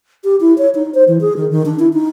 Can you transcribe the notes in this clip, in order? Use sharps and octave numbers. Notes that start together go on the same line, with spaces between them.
G4
E4
C#5
D#4
C5
E3
G#4
D#3
D#3
D4
E4
D#4